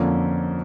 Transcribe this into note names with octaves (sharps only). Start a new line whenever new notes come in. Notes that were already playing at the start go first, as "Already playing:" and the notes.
Already playing: F2 D3 F3 A#3 C#4